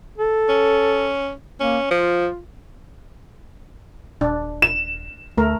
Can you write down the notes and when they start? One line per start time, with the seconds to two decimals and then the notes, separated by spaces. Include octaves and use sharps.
0.18 A4
0.49 C#4
1.60 A#3 C#4
1.91 F3 F4
4.21 D#1 D4
4.62 E7
5.37 D2 A3 A#4